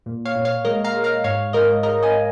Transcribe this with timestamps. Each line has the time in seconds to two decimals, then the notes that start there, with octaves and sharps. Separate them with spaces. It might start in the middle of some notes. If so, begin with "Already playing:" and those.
0.06 A#2
0.25 C#5 F5
0.36 A#2
0.45 C#5 F5
0.65 G#3 A#4 D#5
0.84 F5 A#5
0.94 G#3
1.04 F5 A#5
1.24 G#2 C#5 F5
1.53 G#2 A#4 D#5
1.83 G#3 A#4 D#5
2.03 D#5 G#5